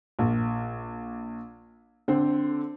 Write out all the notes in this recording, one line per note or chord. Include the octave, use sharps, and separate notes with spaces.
A#1
D3 C4